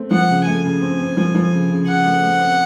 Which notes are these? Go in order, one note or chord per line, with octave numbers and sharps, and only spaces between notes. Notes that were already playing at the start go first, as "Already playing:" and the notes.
Already playing: A3 C4
F3 F#5
C#3
A3 G#5
C#3
C4
C4
F3
F3
C#3
C#3
C#3 F#5
A3
A3
C4